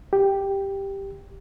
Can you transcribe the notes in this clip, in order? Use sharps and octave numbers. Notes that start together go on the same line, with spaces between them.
G4